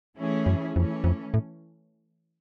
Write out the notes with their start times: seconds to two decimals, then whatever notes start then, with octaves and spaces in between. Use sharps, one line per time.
0.17 E3 A3 C#4 E4 G#4
0.46 F#2
0.75 F2 E3 A3 C#4
1.04 F2
1.34 A2